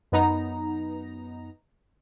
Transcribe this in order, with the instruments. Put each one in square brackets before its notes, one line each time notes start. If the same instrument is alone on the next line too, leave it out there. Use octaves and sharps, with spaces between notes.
[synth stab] F#2 B3 D#4 A#5